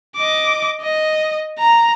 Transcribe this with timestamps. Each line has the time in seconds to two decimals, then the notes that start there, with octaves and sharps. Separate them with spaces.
0.17 D#5 D6
0.81 D#5
1.59 A#5